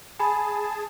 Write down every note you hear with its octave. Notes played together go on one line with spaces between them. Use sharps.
G#4 G#5 A5 B5